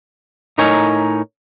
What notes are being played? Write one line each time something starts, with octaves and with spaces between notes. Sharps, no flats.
A2 D#4 A#4 C#5 G#5